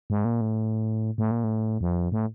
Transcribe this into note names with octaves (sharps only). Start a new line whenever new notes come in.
G#2
A#2
A2
A2
A#2
A2
F2
A2